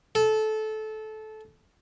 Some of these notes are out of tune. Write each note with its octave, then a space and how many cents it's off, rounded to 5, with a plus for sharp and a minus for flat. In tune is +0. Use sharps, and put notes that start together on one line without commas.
A4 -20